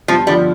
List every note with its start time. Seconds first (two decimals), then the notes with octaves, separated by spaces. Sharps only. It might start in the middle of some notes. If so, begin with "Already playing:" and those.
0.08 G2 F3
0.27 D3 F3 G3